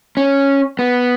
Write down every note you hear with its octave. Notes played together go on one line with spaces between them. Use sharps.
C#4
B3